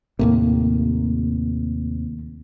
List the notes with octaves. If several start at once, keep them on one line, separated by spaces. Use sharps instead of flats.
D#2 A2 C3 A#3